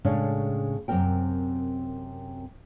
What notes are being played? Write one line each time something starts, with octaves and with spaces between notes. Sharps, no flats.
A2 C#3 G#3 A3 C#4 D4
F#2 C3 G#3 C4 A#4 G5